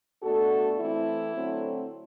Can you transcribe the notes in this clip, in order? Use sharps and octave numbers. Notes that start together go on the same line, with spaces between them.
B2 A3 D4 F#4 A4
E3 A3 C4 E4
D3 F#3 A3 C4